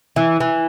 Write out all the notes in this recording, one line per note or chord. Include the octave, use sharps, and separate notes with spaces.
E3
E3